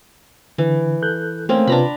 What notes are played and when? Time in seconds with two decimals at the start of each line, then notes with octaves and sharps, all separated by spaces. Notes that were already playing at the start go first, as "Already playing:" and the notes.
0.58 D3 E3
1.02 A4 F#6 G6
1.49 A3 A#3 C4 C#4
1.67 C3 D4 F4 B4 A#5 B5